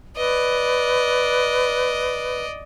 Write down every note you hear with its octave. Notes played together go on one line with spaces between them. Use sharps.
B4 D5 D#5